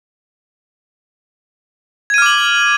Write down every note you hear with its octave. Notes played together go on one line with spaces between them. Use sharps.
D6 F6 G#6 D#7 F#7